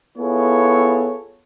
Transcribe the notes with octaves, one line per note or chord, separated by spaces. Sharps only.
B3 E4 F4 G#4 A4 C#5